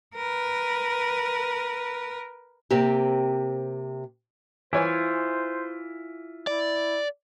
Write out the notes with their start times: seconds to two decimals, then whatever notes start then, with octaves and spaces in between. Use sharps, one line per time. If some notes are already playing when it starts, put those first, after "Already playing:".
0.16 A#4 B4
2.71 C3 A#3 C4 G4
4.73 E3 E4 F4 C5 C#5 G#5
6.47 E4 D5